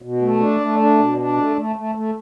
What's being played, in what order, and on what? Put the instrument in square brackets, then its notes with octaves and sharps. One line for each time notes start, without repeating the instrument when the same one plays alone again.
[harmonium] B2
A3
D4
A3
D4
B2
D4
A3
A3
A3
A3